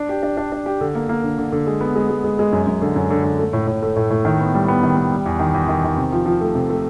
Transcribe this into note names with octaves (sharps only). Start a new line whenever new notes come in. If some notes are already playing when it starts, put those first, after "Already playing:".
Already playing: D4
G4
D4
D4
D4
G4
D3
A#3
A#3
D3
D3
D3
G#3
B3
G#3
G#3
G#3
G#3
F#2
F#2
D3
F#2
D3
D3
A3
A2
A2
A3
A2
A2
D#3
B3
G3
B3
D#3
B3
G3
E2
D#3
E2
D#3
D#3
C3
F3
F3
A3
C3
A3